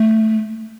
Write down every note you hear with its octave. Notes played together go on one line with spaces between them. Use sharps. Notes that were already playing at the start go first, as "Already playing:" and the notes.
Already playing: A3